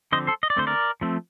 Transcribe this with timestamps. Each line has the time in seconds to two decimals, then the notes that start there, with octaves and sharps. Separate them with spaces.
0.12 D3 F3 C4 C5 D#5
0.27 A4 C5
0.43 D#5
0.50 D5
0.56 D3 A3 C4 C5
0.67 A#4 D5
1.01 F3 A3 C4